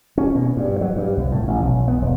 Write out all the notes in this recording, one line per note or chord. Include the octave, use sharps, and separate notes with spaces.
C#4
B2
G2
F#3
G2
C2
A2
A1
B1
B3
E1